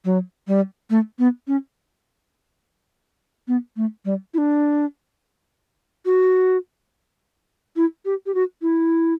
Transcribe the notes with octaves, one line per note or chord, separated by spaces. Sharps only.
F#3
G3
A3
B3
C#4
B3
A3
G3
E4
D4
F#4
E4
G4
G4
F#4
E4